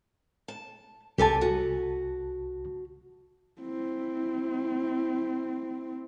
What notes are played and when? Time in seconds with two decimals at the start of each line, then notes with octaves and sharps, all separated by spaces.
0.48 A5
1.18 C2 G4 A4 G#5 A5
1.41 F#4
3.61 C4 E4